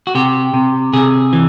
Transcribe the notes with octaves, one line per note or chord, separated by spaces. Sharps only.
F#4
C3 G4
C3
C3 G#4
E3